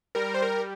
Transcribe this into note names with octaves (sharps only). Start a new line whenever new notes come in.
G3 A#4
C5
A#4